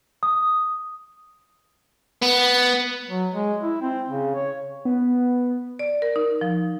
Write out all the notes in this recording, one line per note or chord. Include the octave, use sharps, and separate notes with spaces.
D#6
B3
F#3
G#3
E4
C4
C#3
C#5
B3
D5
A#4
D#4
F3